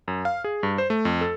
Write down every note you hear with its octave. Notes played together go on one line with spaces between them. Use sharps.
F#2
F5
G#4
G2
C5
A3
F2
A4